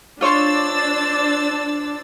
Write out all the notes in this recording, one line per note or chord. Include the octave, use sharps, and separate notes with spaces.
D4 F4 C5 C#5 C6 E6 A6